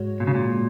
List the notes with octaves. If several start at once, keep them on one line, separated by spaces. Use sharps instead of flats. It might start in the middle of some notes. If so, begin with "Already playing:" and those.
Already playing: G#2 G#3 F#4 C#5
A#2
C#3
A#2